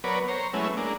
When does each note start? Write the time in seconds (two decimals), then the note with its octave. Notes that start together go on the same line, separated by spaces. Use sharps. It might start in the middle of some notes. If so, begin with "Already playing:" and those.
0.04 F#3 B3 A#4 B4 C#5 D5
0.28 C5 C#5 A#5
0.53 F#3 G#3 A3 B3 C#4 E4
0.77 G#3 A#3 D4